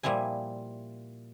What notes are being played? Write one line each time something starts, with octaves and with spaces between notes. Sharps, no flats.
A#2 F3 G3 E4 G#5